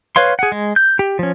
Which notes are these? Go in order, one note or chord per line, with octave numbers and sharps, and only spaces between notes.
B4 C#5 F5 C6
G#4 F#5
G#3
G6
G4
F3 C#4